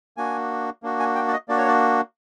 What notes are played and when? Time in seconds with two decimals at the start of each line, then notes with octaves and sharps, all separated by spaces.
0.17 A#3 D4 F#4 G#5
0.83 A#3 D4 F#4
1.00 G#5
1.15 G5
1.28 D5
1.32 D#5
1.48 A#3 D4 F#4 D5
1.58 C#5
1.68 D5